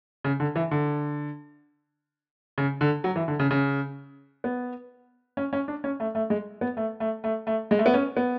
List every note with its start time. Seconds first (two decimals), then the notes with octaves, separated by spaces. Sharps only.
0.24 C#3
0.40 D3
0.56 E3
0.71 D3
2.58 C#3
2.81 D3
3.04 F#3
3.16 E3
3.28 D3
3.39 C#3
3.51 C#3
4.44 B3
5.37 C#4
5.53 C#4
5.68 D4
5.84 C#4
6.00 A3
6.15 A3
6.30 G#3
6.61 B3
6.77 A3
7.00 A3
7.24 A3
7.47 A3
7.71 G#3
7.79 A3
7.86 B3
7.94 C#4
8.17 B3